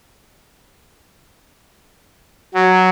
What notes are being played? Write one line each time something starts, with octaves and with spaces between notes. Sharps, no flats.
F#3